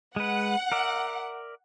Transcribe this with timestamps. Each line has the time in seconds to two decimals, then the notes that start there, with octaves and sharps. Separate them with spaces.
0.16 G#3 B4 F#5
0.72 A#4 D5 E5